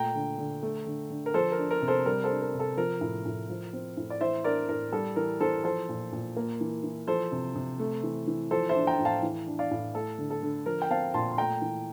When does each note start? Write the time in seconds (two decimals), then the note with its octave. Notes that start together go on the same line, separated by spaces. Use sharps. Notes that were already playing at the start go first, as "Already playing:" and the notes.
Already playing: A#2 A3 G5 A#5
0.15 D3
0.38 D3
0.63 A3
0.87 D3
1.10 D3
1.26 A#4
1.34 F3 A4 C5
1.52 A#4
1.58 D4
1.71 A#4
1.82 C3
1.88 A4 C5
2.06 G3 A#4
2.24 A4 C5
2.30 D4
2.42 A#4
2.54 C3
2.59 A4
2.77 F3 A#4
3.01 A2
3.25 A2
3.49 F3
3.73 C4
3.97 A2
4.10 D5
4.21 E3 C5 E5
4.44 D4 A#4 D5
4.69 A2 A#4
4.92 G3 A4
5.16 E3 A#4
5.40 E3 A4 C5
5.64 F3 A4 C5
5.89 A#2
6.12 A#2
6.37 A#3
6.61 E3
6.84 E3
7.08 F3 A4 C5
7.32 C3
7.56 C3
7.80 A3
8.03 E3
8.27 E3
8.51 F3 A4 C5
8.69 C5 E5
8.75 D4
8.87 G5 A#5
8.99 A2
9.05 F5 A5
9.23 E3
9.47 D4
9.59 D5 F5
9.71 A2
9.94 A3 A4
10.18 D3
10.30 A4
10.43 D3
10.66 F3 A#4
10.82 G5
10.90 C4 F5 A5
11.14 A#2 A5 C6
11.31 C6
11.38 A3 G5 A#5
11.62 E3